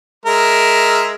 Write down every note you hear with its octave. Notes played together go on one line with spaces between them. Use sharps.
G#3 A#4 E5